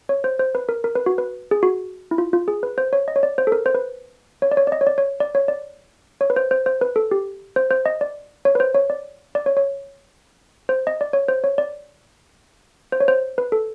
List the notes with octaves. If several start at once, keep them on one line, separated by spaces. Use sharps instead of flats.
C#5
C5
C5
B4
A#4
A#4
B4
F#4
B4
G#4
F#4
E4
F4
F4
G#4
B4
C5
C#5
D#5
C#5
D5
C5
A4
A#4
C5
B4
C#5
D5
C#5
D5
D#5
C#5
D5
C#5
D5
C#5
D5
C#5
B4
C5
C5
C5
B4
A4
G4
C5
C5
D#5
D5
C#5
B4
C5
C#5
D5
D5
C#5
C#5
C5
D#5
D5
C#5
C5
C#5
D5
C5
C#5
C5
B4
A4